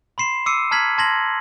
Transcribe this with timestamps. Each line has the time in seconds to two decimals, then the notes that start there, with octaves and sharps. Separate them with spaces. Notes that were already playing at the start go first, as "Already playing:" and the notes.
0.18 B5 C6 C7 E7
0.46 D6 E6 C7 C#7 D#7
0.71 A5 A#5 F6 G#6 B6 F#7
0.98 A5 C6 G#6 A#6 B6 F#7